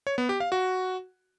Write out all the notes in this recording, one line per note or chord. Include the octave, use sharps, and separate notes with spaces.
C#5
B3
G4
F5
F#4